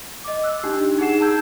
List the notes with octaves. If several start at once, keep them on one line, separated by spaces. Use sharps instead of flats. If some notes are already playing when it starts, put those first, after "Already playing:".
D#5 D6
E6 F#6
D4 D#4 G4
D#4 G#4 F#5 C7 E7
A5 A#5 E6 G6 G#6